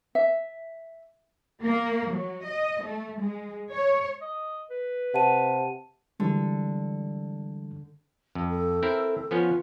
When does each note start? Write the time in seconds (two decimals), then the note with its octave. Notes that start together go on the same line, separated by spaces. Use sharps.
0.15 E5
1.63 A#3
2.12 F#3
2.45 D#5
2.83 A3
3.21 G#3
3.71 C#5
4.21 D#5
4.71 B4
5.14 C3 F#5 A5 D#7
6.20 D3 E3 G3 G#3
8.35 F2
8.50 A4
8.83 C4 E4 A#4
9.31 F3 B3 C#4 F4